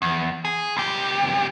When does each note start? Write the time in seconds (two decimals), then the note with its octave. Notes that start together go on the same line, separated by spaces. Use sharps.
0.02 E2
0.45 G#4
0.77 C#2 G4